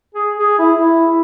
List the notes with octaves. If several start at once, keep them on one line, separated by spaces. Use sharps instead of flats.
G#4
G#4
E4
E4